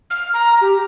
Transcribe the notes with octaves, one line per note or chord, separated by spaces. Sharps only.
F6
A#5
G4